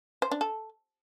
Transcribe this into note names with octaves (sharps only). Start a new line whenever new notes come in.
C5
D4
A4